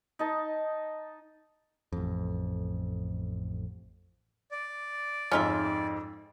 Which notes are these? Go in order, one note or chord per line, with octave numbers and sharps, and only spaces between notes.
D#4 D#5 A5
A1 F2
D5
F2 G#2 C#4 F4 E5